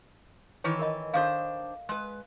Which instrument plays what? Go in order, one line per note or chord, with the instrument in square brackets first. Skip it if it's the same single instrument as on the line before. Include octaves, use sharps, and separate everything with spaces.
[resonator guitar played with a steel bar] D#3 E3 C#5
[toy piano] A#4 D#5
[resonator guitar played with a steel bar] D#3 D4 C5 [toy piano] A4 F5
[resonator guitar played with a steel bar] G#3 B4